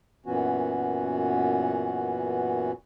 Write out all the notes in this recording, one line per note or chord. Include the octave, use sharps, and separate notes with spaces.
F#2 A#2 E3 B3 C#4 F#4